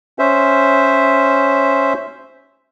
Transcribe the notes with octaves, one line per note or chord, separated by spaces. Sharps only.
C#4 C5 E5